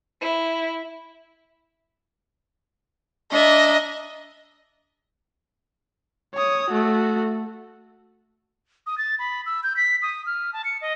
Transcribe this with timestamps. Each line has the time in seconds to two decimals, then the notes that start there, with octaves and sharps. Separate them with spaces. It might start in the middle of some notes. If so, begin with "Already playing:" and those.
0.21 E4
3.31 D4 D#5 E5 A#5
6.34 C#5 D#6
6.70 A3 F#4
8.87 D#6
8.98 A6
9.19 B5
9.46 E6
9.63 G6
9.77 B6
10.02 D#6
10.26 F6
10.53 A5
10.65 C#7
10.81 D#5